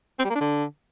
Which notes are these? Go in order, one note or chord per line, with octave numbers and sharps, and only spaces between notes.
C4
G3
A#3
D4
D3